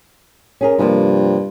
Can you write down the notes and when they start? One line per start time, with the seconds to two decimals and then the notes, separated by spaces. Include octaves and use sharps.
0.61 C#4 G#4 A#4
0.78 G2 C3 F3 A#3